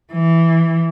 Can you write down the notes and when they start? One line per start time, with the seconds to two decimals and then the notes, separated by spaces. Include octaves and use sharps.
0.13 E3